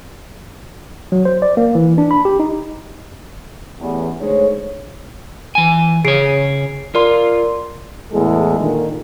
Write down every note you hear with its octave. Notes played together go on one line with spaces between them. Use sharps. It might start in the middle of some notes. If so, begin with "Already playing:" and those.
F#3
C5
D5
A#3
E3
D4
B5
G4
D#4
A1 E2
D3 G#3 A3 D#4 C5 C#5
E3 G#5
C#3 G#4 C#5 C7 D7
F4 A#4 D5 C6
E2 A2 G#3 A4
A#2 D3 D#3